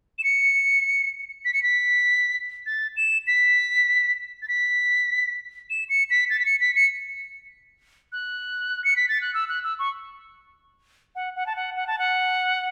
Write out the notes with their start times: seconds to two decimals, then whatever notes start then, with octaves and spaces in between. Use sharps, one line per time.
0.19 E7
0.24 C#7
1.45 B6
1.54 C#7
1.63 B6
2.66 A6
2.97 E7
3.27 B6
4.42 A6
4.48 B6
5.70 E7
5.89 C#7
6.10 B6
6.30 A6
6.39 B6
6.45 C#7
6.61 B6
6.75 C#7
8.13 F#6
8.84 C#7
8.96 B6
9.09 A6
9.21 F#6
9.34 E6
9.49 F#6
9.64 E6
9.79 C#6
11.15 F#5
11.36 F#5
11.46 A5
11.56 F#5
11.76 F#5
11.87 A5
11.99 F#5